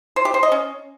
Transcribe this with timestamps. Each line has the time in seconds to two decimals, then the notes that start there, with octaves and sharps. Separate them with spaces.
0.16 C5
0.25 G4
0.34 C5
0.43 D#5
0.52 C#4